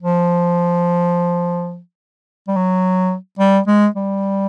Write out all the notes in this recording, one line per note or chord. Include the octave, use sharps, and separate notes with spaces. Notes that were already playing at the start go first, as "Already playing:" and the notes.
F3
G3
F#3
G3
G#3
G3